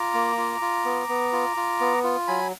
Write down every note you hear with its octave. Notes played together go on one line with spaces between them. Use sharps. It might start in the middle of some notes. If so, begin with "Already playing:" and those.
Already playing: F4 A#5 D6
A#3
F4
F4
B3
B3
F4
F4
B3
F4
F#3 G#5 B5